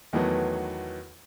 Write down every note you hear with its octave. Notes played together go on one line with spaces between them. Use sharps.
E2 D#3 E3 F#3 A3 B3